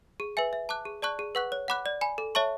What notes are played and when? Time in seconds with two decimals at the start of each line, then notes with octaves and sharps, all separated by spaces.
0.20 G#4
0.37 B4 E5 G#5
0.53 E5
0.69 A5 D6 F#6
0.85 G#4
1.02 D5 A5 C#6 F#6
1.19 G#4
1.35 B4 F#5 C#6 F#6
1.52 C#5
1.68 F#5 B5 D6 F#6
1.86 D5
2.01 G#5 B5
2.18 A4
2.35 C#5 E5 A5 C#6